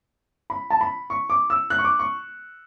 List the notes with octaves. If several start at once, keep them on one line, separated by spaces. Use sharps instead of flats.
B5
A5
B5
C#6
D6
E6
F#6
C#6
D6
C#6